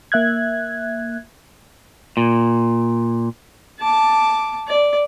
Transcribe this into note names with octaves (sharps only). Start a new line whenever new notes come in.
A#3 E5 F#6 G#6
A#2
A5 D6
D5